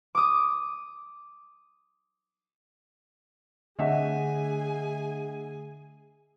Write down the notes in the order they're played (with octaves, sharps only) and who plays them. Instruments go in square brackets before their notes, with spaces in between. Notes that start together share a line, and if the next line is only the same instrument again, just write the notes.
[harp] D6 D#6
[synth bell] D3 A3 D4 [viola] G#4 G#5 [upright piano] D#5 E5 F#5